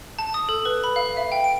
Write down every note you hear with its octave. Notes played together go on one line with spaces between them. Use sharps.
A5
D#6
A4
B4
B5
F5
E5
G5
D7